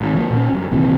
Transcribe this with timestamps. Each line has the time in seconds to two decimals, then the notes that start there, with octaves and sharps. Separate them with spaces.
0.01 G#1
0.13 D3 F3 G#3 A#3
0.30 A#2 C#4
0.53 G1 F#2
0.71 A#1 D#2 C3 E3